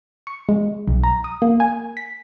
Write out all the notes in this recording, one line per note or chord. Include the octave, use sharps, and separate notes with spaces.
C#6
G#3
B1
A#5
D#6
A#3
G#5
B6